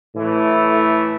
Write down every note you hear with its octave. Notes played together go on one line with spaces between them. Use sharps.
A2 E3 A3